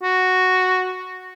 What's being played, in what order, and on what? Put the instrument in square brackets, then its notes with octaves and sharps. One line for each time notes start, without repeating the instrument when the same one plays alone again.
[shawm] F#4